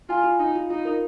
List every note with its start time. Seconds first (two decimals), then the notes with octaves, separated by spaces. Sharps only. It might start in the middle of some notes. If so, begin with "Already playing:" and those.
0.09 F4 G#5
0.24 F4
0.39 D#4 F4
0.55 F4
0.70 D#4 F4
0.85 A#4